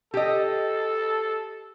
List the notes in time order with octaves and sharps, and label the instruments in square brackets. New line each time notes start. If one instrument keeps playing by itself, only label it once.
[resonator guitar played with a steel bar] G4 D#5 [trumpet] A4